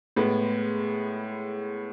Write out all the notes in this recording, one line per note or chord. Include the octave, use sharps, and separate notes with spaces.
A2 G#3 B3